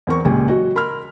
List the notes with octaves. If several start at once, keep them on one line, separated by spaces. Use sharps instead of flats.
E2 C4 A#4 C#6
C#2 A#2 G#3 G4 G#5
F#3 F#4 D#5
A#4 B5 C6 F6